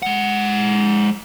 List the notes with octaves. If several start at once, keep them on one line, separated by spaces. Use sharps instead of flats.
G#3 F#5